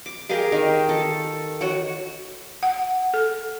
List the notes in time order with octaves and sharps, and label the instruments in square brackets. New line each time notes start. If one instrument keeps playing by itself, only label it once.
[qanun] D6
G4 G#4 A#4 F5
D#3
A4
F#4 C#5 F#5
[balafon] F#5
A4